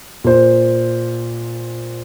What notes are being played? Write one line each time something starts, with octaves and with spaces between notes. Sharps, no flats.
A#2 C5